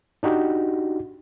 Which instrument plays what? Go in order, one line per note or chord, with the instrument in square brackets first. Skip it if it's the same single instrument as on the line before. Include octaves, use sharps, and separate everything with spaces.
[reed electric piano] D4 D#4 F#4 G4